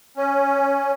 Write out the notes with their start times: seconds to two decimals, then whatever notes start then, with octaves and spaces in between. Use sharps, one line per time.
0.17 C#4